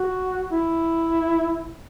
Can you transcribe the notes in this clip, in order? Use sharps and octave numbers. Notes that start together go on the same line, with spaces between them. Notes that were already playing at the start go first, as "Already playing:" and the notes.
Already playing: F#4
E4